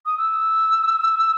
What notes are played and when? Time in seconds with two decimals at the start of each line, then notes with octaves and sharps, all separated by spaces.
0.06 D#6
0.18 E6